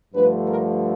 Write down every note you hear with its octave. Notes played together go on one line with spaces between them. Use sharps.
G2 D3 F3 A3 B4
A#4